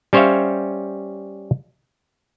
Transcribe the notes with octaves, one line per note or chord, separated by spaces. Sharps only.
G3 C#4 C5 C#5 E5 F5